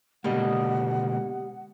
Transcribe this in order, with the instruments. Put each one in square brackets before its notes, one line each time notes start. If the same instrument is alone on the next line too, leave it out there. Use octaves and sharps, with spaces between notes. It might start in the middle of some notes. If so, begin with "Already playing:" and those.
[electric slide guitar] B2 D3 A#3 [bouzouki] G3 D#5 [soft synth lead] G#3 [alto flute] F#5